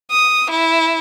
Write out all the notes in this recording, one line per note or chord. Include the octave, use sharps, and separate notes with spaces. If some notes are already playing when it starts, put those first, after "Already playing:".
D#6
E4